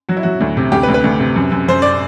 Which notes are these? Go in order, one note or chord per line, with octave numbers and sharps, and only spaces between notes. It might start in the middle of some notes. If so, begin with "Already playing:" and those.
F#3 F#4
E4
F#3 F#4
D2
C3
D2 G4
B4
D2
B4
D2
C3
F#2
F#2
F#2 C5
D5